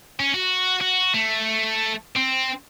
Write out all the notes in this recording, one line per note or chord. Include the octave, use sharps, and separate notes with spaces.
C#4
F#4
F#4
A3
C4